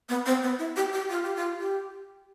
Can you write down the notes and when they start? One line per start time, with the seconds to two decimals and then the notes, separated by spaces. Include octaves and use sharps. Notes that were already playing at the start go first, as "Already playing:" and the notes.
0.09 B3
0.26 C4
0.43 B3
0.59 E4
0.76 G4
0.93 G4
1.10 F4
1.23 G4
1.36 F4
1.60 G4